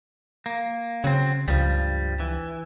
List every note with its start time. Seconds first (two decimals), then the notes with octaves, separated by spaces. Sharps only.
0.46 A#3
1.04 C#3 F#3 C4
1.48 C#2 G2 F3 G3
2.20 E3